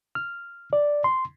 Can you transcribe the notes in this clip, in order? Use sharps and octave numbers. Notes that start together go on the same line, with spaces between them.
F6
D5
C6